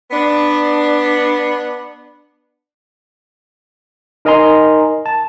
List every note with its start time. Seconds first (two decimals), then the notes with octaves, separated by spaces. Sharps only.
0.11 B3 D4
4.25 D#4 A#4 D#5 G#5 A#5 C6
5.06 A5